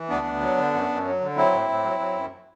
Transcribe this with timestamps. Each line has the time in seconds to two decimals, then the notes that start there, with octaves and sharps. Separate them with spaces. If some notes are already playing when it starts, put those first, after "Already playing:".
Already playing: E3
0.09 D2 B3 D4
0.26 D2
0.41 F#3
0.57 D3
0.73 F#2
0.89 F#2
1.05 F#3
1.21 D3
1.36 F#3 C4 E4
1.53 A2
1.69 A2
1.84 F#3
1.99 F#3
2.16 F#2